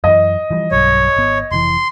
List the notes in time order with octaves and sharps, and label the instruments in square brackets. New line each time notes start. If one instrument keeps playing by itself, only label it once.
[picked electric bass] F#2 E3 [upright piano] D#5
[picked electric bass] E3 F3 G3
[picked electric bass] B1 G2 F#3 [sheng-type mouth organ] C#5
[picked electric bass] G#1 B3
[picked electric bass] F1 G#2 E3 [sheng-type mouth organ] C6